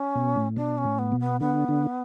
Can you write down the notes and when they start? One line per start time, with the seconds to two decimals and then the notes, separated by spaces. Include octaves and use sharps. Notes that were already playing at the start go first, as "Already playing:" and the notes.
Already playing: C#4
0.16 B2
0.36 A2
0.57 B2 D4
0.78 C#4
0.84 A2
0.99 B3
1.12 B2
1.20 B3
1.40 D3 B3
1.69 D3